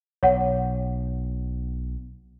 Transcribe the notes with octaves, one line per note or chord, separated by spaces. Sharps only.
B1 C#5 F#5